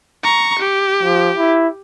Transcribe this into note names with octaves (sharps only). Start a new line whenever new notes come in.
A#5 C#6
G4
F3
E4